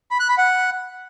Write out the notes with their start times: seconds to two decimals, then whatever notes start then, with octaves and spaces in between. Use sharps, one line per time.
0.11 B5
0.20 F#6
0.29 B5
0.38 F#5